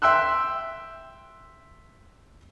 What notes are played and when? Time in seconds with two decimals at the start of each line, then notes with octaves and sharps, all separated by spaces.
0.02 E5 G5 C6 E6 F#6